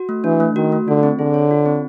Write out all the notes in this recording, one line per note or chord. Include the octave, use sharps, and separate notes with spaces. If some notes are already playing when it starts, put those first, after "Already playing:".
Already playing: F#4
A3
E3 D4
A3
D#3 F#4
A3
D3 F4
C4
D3 G#4
C#5
F4
C4